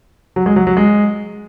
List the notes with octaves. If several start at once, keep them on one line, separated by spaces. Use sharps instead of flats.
F#3
G#3
F#3
F#3
G#3